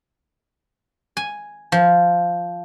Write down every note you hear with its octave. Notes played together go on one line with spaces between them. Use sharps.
G#5
F3